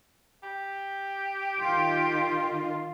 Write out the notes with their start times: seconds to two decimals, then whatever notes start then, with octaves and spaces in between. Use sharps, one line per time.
0.43 G4
1.60 D#3 F4 C6